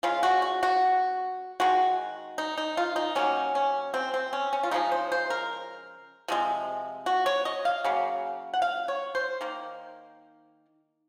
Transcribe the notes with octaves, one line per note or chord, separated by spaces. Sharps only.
C#3 G#3 F4
F#4
F#4
F#4
D#3 G#3 F#4
D#4
D#4
F4
D#4
D#3 F#3 A#3 C#4
C#4
C4
C4
C#4
C#4
F4
C#3 F3 G#3 D#4
C5
C5
A#4
C3 F3 G#3
F#4
C#5
D#5
F5
C#3 F#3 A#3
F#5
F5
C#5
C5
D#3 A#3